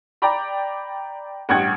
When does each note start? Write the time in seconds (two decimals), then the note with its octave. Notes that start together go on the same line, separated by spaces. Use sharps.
0.22 D5 G5 A#5 B5
1.49 A1 G2 F#5 G5 G#6